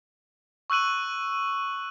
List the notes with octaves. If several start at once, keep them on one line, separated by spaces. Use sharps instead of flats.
C#6 E6 F#6 D#7 F#7